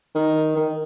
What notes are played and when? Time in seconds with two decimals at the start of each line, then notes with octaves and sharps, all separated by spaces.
0.15 D#3
0.57 D#3